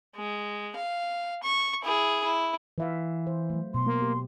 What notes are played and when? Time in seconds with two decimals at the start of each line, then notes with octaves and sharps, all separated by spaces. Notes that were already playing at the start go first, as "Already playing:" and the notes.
0.16 G#3
0.76 F5
1.43 C#6
1.83 E4 G#4
2.24 E4
2.78 E3 B4 E5 F5
3.27 C5
3.50 F#3 A3
3.74 B2 C6
3.87 A#3
4.02 G4